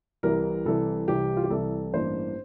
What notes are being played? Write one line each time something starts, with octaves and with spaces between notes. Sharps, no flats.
C2 C3 E3 A#4
C2 C3 E3 A4
C2 C3 E3 G4
F4
G4
C2 C3 E3 A4
A1 G2 E3 A#3 D4 C5